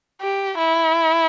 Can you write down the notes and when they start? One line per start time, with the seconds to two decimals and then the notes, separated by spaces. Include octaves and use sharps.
0.21 G4
0.58 E4